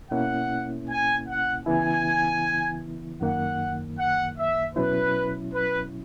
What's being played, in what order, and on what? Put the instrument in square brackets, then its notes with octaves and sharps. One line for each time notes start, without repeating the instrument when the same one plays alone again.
[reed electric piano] B2 A#3 C#4 E4 [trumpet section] F#5
[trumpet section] G#5
F#5
[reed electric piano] C#3 E3 B3 E4 [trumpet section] G#5
[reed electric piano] F#2 D#3 A#3 [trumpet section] F#5
[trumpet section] F#5
E5
[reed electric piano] B2 F#3 C#4 E4 [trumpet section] B4
[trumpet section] B4